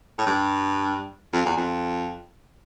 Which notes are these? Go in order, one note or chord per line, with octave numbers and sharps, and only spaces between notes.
A2
G2
F2
E2
F2